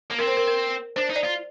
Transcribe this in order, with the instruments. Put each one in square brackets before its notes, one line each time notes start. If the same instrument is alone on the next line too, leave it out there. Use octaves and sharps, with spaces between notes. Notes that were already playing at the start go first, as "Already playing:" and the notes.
[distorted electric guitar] A#3
[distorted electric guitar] C4 [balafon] A#4
[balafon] C5
A#4
A#4
[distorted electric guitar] D4 [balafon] C5
[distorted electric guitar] D#4
[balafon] D5
[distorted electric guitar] F4